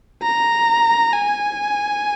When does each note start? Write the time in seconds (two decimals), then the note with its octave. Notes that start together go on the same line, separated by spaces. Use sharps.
0.23 A#5
1.13 G#5